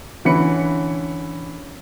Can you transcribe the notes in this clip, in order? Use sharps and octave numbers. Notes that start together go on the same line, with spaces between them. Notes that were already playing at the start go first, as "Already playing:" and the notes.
D3 E3 C#4 B5 C#7